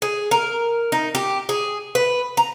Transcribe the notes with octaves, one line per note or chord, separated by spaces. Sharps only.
G#4
A#4
D#4
G4
G#4
B4
A#5